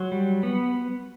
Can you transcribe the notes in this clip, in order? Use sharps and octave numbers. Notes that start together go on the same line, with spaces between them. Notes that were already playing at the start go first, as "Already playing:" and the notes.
Already playing: F#3 C6
G3
B3